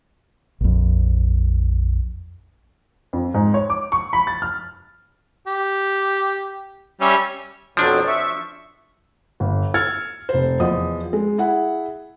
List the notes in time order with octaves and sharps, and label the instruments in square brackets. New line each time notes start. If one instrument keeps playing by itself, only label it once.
[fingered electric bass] A#1 F2
[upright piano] F2
G#2
C#5
D6
C#6
B5
A6
F6
[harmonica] G4
G3 C#4 E5
[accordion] F2 B2 F#3 [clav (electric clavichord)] F3 D4
[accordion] E5 C#6
[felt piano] G1
E6 F6 G#6 A6 C#7
F1 C5
E2 F3 D#5 D#6
G#3
E4 G#4 F#5